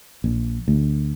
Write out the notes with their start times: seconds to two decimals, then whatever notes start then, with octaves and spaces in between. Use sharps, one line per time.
0.24 A#1
0.68 D2